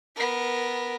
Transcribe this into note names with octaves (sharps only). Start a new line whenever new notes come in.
B3 A#4